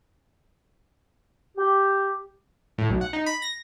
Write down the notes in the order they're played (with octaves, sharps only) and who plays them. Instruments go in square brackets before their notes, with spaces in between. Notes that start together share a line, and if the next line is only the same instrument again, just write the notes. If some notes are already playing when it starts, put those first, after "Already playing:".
[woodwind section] G4
[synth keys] A2
B1
F#5
D#4
B5
A#6